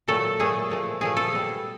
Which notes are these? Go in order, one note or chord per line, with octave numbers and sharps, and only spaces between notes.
A#2 F#3 A3 A4
A#2 F#3 A3 G#4
A#2 F3 A3
A#2 F3 A3 G#4
A4
B2 G3